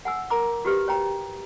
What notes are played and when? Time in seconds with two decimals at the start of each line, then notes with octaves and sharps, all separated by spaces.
0.05 F#5 G#5 E6
0.30 A#4 A#5 D6
0.65 F#4 G4 B4
0.88 C#5 G5 A#5